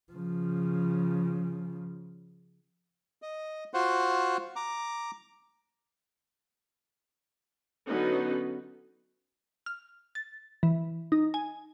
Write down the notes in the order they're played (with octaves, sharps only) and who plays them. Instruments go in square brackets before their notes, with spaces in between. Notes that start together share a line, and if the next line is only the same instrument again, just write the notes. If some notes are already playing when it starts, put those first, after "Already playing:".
[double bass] C#3 F3
[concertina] D#5
F4 F#4 C5 F#5
A#5 D6
[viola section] D3 F#3 B3 C#4 D#4 B4
[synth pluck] F6
A6
E3
D#4
G#5